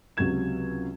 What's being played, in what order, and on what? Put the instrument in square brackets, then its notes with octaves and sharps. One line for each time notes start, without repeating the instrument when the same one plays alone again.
[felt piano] C#2 C3 F#3 F#4 G#6 E7